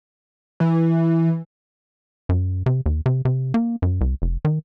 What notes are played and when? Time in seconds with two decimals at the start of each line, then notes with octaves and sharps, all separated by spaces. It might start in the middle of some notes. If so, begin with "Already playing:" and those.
0.60 E3
2.29 F#2
2.66 C3
2.86 D#2
3.06 C3
3.25 C3
3.54 A#3
3.82 F#2
4.01 C2
4.22 F1
4.45 D#3